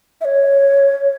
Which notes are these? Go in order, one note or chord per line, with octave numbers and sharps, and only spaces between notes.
E5
C#5